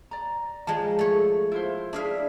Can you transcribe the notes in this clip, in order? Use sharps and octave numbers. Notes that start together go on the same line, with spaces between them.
D5 A#5
F3 G#3 A5
A3 C#5
E4 F4 C5
D4 E4 G#4 E5 F5